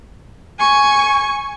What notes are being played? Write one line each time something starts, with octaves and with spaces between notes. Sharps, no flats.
G#5 C#6